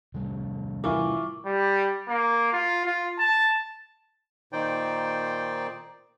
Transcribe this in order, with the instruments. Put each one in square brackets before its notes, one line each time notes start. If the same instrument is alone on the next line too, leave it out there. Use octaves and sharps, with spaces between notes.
[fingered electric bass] C3 G3 A3
[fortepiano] E3 [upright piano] E4 F4 A#4 [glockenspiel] C#6 D6
[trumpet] G3
A#3
F4
F4
A5
[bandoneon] A#2 D#3 D#4 C5 D5 G5